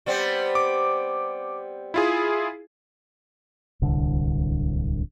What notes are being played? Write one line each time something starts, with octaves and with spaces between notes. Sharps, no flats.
G3 B3 C4
D6
E4 F4 G#4
D1 C2 D3